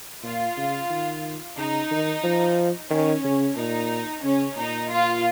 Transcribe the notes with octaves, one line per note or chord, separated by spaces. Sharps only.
A#2 F4
C#3
D#3
C#3 D#4
D#3
F3
D#3 C#4
C#3
A#2 D#4
C#3 C#4
A#2 D#4
F4